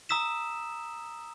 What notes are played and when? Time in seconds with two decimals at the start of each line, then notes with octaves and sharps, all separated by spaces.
0.09 A#5 D#6 E6 B6 E7